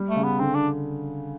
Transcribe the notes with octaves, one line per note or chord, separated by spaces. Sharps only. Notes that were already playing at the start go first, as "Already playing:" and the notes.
Already playing: G3
A3
C#3
B3
D3 C4
D4